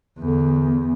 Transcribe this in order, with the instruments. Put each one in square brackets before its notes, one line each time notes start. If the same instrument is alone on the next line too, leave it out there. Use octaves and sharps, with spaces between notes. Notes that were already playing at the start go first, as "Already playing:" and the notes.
[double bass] E2 [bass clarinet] D3